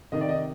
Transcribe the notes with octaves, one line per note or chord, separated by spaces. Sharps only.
C3 D#3 D#5
D5
D#5